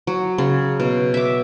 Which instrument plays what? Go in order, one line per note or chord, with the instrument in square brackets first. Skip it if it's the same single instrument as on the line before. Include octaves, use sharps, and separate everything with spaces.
[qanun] F#3
C#3
B2
E5 D6